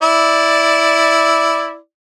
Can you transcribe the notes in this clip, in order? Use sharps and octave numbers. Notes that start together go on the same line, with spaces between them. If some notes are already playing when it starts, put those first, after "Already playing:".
E4 D5